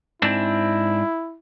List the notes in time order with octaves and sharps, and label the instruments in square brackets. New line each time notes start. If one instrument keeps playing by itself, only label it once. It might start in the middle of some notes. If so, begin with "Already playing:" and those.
[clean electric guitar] G#2 C4 D4 [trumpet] E4